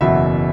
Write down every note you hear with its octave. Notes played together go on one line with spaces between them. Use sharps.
F#1 E2 B2 F#3 E5